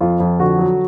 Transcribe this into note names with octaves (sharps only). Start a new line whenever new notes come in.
F2 F4
F2
D3 F#4
F#3